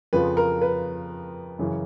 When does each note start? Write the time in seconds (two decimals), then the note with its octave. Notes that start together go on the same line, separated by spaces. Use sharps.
0.13 F2 C#3 F3 B4
0.37 A#4
0.62 B4
1.59 F#2 C#3 E3